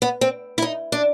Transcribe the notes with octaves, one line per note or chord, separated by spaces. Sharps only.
B3
C4
E4
D#4
D4